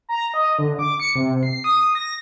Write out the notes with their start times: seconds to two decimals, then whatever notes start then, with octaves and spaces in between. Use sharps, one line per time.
0.09 A#5
0.34 D#5
0.59 D3
0.79 D6
1.00 C#7
1.15 C3
1.43 C7
1.64 D#6
1.95 A#6